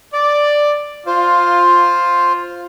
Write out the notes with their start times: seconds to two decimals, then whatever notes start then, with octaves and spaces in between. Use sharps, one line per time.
0.13 D5
1.07 F4 C5